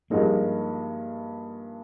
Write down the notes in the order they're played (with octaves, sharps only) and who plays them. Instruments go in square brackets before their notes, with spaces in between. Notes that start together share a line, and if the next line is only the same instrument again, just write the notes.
[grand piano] G2 F3 G#3 D#4 A#4 [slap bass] A#3